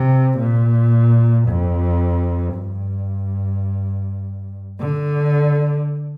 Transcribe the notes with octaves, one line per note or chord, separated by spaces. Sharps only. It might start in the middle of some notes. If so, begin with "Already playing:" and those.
Already playing: C3
A#2
F2
G2
D3